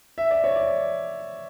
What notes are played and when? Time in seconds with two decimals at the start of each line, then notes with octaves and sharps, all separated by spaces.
0.18 E5
0.31 D5
0.44 C#5
0.56 D5